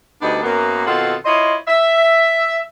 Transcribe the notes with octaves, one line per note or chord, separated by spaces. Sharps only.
D2 G3 B3 D4 D#4
F#2 A#3 B3
B2 D#3 C4 F4 A4 F#5
E4 F4 C5 C#5 D#5
E5